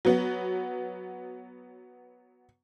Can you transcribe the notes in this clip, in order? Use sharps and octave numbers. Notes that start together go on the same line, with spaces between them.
F#3 B3